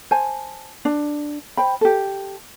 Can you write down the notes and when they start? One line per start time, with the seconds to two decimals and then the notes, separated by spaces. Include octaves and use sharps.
0.11 C5 G#5 A5
0.85 D4
1.57 C5 G5 B5
1.81 G4 A4